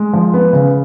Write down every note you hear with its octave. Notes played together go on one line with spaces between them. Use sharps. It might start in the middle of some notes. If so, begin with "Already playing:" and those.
Already playing: G#3
F3
B3
C#3